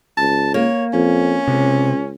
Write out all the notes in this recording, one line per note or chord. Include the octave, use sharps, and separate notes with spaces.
C#2 A5
A#3 C#5
F2 C#4
C#2 C3